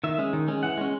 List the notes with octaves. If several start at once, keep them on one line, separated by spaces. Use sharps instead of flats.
D#3 E5
G#3 C#4
D#3
G#3 C#4
E3 F#5
G#3 C#4